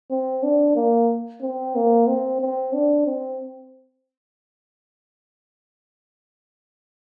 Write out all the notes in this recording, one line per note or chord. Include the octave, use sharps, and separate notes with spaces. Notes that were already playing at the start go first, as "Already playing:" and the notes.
C4
D4
A#3
C4
A#3
C4
C4
D4
C4